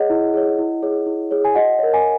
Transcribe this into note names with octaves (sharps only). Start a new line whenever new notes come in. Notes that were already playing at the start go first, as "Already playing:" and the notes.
Already playing: G#4 C#5 D#5 F#5
E4
G#4 C#5
E4
G#4 C#5
E4
G#4 C#5
G#5
F#4 D#5 F#5
A#4 C#5
G#5